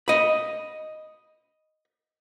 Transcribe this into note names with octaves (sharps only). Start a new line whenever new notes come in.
D#5 B5